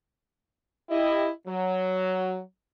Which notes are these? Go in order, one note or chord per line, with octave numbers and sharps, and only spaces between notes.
E4 G4 D#5
F#3